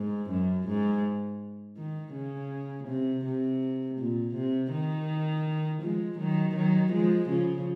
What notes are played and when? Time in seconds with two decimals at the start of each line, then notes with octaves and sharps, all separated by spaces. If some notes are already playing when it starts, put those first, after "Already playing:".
Already playing: G#2
0.30 F#2
0.67 G#2
1.77 D#3
2.14 C#3
2.88 C3
3.25 C3
3.98 A#2
4.35 C3
4.71 D#3
5.82 F3 G#3
6.18 D#3 F#3
6.55 D#3 F#3
6.92 F3 G#3
7.29 C#3 F3